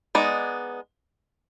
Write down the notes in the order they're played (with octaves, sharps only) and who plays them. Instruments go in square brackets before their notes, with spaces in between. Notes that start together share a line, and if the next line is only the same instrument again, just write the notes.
[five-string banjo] G#3 B3 D#4 D5